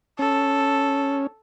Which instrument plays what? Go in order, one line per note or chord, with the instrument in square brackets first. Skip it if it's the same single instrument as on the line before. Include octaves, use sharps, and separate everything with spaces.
[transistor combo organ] C#4 [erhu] A4